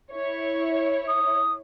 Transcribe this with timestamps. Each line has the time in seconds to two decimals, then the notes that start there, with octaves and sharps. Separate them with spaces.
0.11 E4 C#5
1.08 D#6